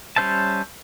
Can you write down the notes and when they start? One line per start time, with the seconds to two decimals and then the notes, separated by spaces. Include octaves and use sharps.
0.16 G3 C#4 C5 E5 A5